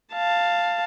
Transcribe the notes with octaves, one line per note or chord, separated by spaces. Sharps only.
F5 A5